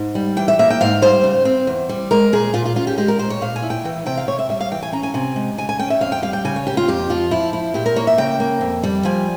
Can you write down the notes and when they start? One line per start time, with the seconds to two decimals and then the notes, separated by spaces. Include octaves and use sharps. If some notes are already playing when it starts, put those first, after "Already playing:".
Already playing: G#2
0.15 G3
0.37 E3 G5
0.48 E5
0.59 A#3 E5
0.70 G5
0.81 G#2 F5
1.02 G3 C5
1.24 C#3
1.45 C4
1.67 E2
1.89 G3
2.11 G#3 A#4
2.33 A#2 G#4
2.54 A#2 F4
2.65 F4
2.76 C#4 F4
2.87 G4
2.98 G#3 G4
3.08 A#4
3.19 A#2 C5
3.30 C#5
3.41 A#2 F5
3.56 G#5
3.62 E4
3.70 G5
3.85 E3 G5
4.06 C3 G5
4.17 F5
4.27 C3 C#5
4.39 E5
4.49 G3 E5
4.60 F5
4.71 E3 G5
4.82 G#5
4.93 C#4 A#5
5.03 G#5
5.14 C3 G#5
5.36 G#3
5.58 C#3 G#5
5.69 G#5
5.79 C#4 G5
5.90 E5
6.01 F2 F5
6.12 G5
6.23 G3 F5
6.33 G5
6.45 C#3 G#5
6.56 C#5
6.66 A#3 G4
6.77 F4
6.88 F2 G4
7.09 F3 F4
7.31 F3 E4
7.53 E4
7.74 A#2 G4
7.86 A#4
7.96 A#3 C#5
8.07 E5
8.18 C#3 G5
8.40 A#3
8.61 F2
8.83 G3
9.05 F3 G#5